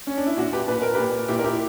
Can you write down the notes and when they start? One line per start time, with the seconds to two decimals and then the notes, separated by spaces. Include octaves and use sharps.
0.07 C#4
0.17 D4
0.27 E4
0.37 A#2 D4 F#4
0.53 G4 B4
0.68 A#2 B4
0.82 A#4
0.94 A#2 G4 B4
1.28 A#2 E4 G4
1.39 A#4
1.44 E4 G4